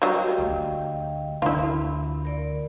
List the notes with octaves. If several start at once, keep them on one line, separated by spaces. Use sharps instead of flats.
F#3 G3 D#5 F5 G5
D2
D2 E4 F4 B5
A#4 D5